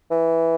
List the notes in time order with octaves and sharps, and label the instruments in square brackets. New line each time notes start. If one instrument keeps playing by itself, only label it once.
[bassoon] E3